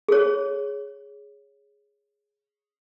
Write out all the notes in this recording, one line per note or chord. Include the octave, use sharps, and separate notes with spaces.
G#4 C#5